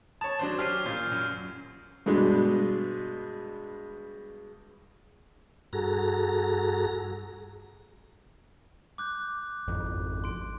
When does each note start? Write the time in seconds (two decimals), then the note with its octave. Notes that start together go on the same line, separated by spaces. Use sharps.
0.21 C#5 A5 D#6
0.39 F#3 D4 C5
0.59 C#4 G4 F6 C7 D#7
0.86 A#2 G6
1.12 F#2
2.06 G2 B2 G#3 D4
5.73 G2 F#4 G#4 A4 A#5 A#6
8.98 D6 F#6 G6
9.68 G#1 F2
10.24 C6 D7